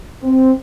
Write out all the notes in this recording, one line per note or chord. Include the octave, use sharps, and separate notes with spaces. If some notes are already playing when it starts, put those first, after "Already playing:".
C4